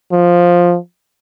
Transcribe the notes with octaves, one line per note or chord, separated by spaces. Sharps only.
F3